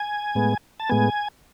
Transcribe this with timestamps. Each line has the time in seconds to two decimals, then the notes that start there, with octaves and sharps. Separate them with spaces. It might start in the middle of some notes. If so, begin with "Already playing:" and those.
Already playing: G#5
0.35 A2 G#3 B3
0.80 A5
0.89 A2 G#3 B3 G#5